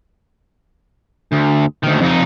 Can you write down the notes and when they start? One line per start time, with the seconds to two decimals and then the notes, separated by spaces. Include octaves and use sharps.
1.32 D2
1.84 D2 D#3
2.01 F2 D#4